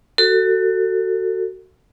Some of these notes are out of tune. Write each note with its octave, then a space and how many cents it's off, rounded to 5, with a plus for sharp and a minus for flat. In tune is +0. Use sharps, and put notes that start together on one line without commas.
F#4 +15 A4 +30